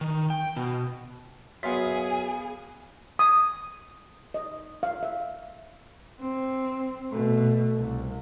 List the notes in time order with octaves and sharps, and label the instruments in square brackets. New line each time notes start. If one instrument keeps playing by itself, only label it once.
[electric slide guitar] D#3
G5
B2
[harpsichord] F#2 C6 [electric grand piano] B3 F5 B6 [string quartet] G#4 G#5
[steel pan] D#6
D#5
F5
E5
[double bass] C4
B2 A3
C2